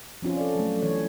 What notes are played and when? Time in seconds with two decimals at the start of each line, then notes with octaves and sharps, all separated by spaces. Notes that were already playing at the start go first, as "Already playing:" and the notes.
0.22 F3 C4 C#4 F4
0.36 A4 D5
0.56 F#3 A3
0.82 E3 C#5